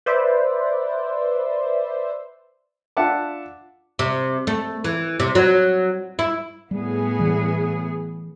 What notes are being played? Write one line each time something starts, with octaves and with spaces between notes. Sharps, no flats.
B4 C5 D5 E5
D4 F4 E5 F#5 A5 D6
C3
A3
E3
C3
F#3
E4
A2 G3 B3 G#4
E3 G3